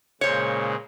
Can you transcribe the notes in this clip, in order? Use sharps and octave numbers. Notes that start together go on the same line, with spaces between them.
A#2 C#3 G#3 C5 C#5